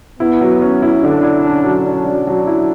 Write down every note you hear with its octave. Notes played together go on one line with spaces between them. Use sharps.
B3 E4
F#3
C#4
E4
D3 D4
E4
C#4
F#3
C#4 D4
F#3
F#3
E4